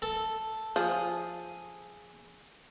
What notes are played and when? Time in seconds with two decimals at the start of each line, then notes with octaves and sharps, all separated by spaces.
0.02 A4
0.76 F3 G#4